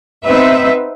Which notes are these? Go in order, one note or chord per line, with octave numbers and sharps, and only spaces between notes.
B3 C4 D#4 B4 E5